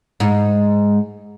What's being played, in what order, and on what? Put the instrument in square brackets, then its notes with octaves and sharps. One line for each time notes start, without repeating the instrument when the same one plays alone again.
[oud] G#2 D#4